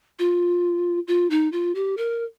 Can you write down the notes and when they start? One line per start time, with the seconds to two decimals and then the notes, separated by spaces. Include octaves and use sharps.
0.19 F4
1.08 F4
1.30 D#4
1.52 F4
1.75 G4
1.97 A#4